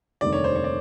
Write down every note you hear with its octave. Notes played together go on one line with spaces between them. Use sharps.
F1 D#2 D3 G3 D5
C#5
C5
C#5
D5